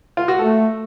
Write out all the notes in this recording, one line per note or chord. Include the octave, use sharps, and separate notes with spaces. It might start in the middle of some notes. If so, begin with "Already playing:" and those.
F4
F#4
A3 A4